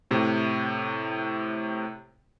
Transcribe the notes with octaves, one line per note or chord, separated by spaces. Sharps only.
A2 C3